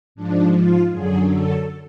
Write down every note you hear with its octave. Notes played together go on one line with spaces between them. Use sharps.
G#2 F3 D4
F4
F#2 D3 F#3 G#4
A4